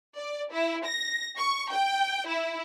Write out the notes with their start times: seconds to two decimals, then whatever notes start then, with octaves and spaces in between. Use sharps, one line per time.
0.17 D5
0.52 E4
0.85 A#6
1.37 C#6
1.70 G5
2.28 E4